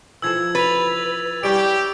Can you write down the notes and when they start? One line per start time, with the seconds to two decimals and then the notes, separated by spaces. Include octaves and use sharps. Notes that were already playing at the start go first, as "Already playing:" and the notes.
0.22 E3 F3 A4 E6 G#6
0.55 B4 A6 F7
1.43 G3 C#4 E4 G4 D7